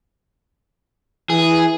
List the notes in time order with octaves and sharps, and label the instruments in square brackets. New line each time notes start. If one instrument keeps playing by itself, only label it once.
[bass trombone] E3 [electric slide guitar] G#4